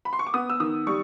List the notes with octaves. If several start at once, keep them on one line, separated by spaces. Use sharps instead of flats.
B5
C6
C#6
D6
B3 D#6
E6
D#3 D#6
G3 C#6